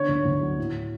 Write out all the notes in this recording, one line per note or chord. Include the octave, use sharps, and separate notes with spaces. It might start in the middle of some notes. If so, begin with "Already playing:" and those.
Already playing: D3 C#5
D2
D2
F#3
A2